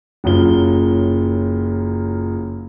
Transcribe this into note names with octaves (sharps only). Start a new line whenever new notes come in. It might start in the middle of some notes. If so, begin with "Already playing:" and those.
F#1 F#2 F4 G7